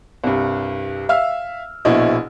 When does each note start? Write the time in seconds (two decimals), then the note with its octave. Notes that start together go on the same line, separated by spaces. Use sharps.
0.24 C2 G2
1.09 E5 F5 E6 F6
1.85 A#1 B2 E4 D#5